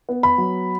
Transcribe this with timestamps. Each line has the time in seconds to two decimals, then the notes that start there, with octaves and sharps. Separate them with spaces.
0.09 B3
0.23 B5
0.38 F#3